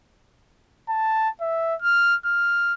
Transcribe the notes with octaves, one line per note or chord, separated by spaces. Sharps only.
A5
E5
F6
F6